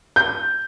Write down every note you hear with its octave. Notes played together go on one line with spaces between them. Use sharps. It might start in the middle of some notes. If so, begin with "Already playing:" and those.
G6